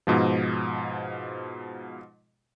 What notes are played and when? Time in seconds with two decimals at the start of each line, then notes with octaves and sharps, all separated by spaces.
0.07 G#2 B2 F3